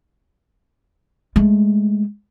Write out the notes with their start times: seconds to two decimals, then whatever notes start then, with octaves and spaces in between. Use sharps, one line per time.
1.36 G#3 A3